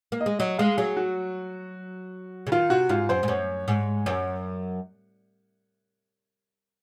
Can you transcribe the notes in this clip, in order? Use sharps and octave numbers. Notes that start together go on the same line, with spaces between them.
A#3
D#5
G#3
F#3 D#5
G#3 F5
F#3 G#4
F#4
C#3
D#3 F4
C3 F#4
G#2 F4
F#2 C5
G#2
F#2 C#5
G#2
F#2 C#5